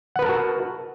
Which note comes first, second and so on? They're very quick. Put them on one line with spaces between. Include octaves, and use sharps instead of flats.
F#5 B4 A#4 A5 F#4